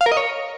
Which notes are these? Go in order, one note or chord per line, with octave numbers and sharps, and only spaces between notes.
F5
A#4
D#5
C#5